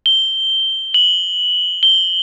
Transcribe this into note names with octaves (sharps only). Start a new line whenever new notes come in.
G7
F#7
G7